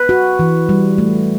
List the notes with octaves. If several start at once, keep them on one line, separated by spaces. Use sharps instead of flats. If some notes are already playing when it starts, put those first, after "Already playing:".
Already playing: B4
F#4
E3
G3
A3